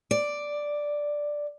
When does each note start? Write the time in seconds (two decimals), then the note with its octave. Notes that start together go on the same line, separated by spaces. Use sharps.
0.11 D5